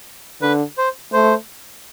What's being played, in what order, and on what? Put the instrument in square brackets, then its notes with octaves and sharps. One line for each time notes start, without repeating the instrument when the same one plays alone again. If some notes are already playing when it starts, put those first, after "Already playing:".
[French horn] D3 [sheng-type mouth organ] B4
[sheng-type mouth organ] C5
[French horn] A3 [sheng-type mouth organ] C5